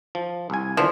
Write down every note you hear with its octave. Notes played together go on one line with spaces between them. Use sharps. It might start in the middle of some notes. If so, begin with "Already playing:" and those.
F3
C2 G#5
G1 D3 E3 F3